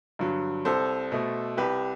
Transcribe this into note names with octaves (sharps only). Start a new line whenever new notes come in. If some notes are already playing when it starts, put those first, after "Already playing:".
G2 D3 F#3
C2 A4 C5
B2 A3
C2 G4 B4